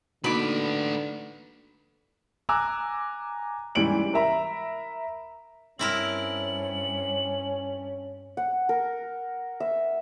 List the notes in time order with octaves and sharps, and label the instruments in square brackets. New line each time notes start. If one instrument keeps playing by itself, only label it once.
[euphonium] D3 [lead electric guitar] A3 B4 [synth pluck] A#3 D#4 F#4 [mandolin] B5 D6
[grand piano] G#5 A#5 D6 E6 F#6
G#2 E3 G3 C#4 D7 F#7
A#4 E5 A#5 B5
[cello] G2 [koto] C4 E4 A#4 [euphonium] C#4 [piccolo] F#7
[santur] F#5
A#4
E5